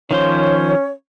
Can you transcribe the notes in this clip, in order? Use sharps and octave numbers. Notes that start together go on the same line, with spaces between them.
D#3 F3 C#4 C5 C#5